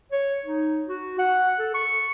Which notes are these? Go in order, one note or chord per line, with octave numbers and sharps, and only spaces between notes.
C#5
D#4
F#4
F#5
A4
C#6